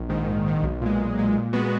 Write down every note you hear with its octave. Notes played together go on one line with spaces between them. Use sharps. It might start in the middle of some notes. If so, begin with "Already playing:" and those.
Already playing: A#1
G#2 D#3
A#1
G#2 D#3
B1
A#2 G#3
B1
A#2 G#3
A#2
G#3 B3 F#4